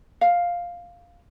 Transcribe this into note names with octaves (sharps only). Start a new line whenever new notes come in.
F5